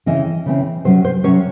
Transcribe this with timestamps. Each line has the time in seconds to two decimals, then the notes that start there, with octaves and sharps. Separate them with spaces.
0.06 C#3 E3 C4 D#5
0.46 C#3 E3 C4
0.84 C3 F#3 C#4 C5
1.05 C5
1.24 C3 F#3 C#4 C#5